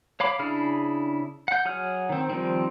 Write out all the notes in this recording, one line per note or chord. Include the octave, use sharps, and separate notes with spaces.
C#5 F5 B5 D6
C#3 D4 E4 G#4 F6
F#5 G6
F#3 G#4 C#5 F#5 F6
D#3 C4
D#3 F3 G3 C4